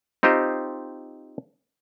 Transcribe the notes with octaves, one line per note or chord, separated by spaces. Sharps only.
C4 D#4 F4 G4 C5 D#5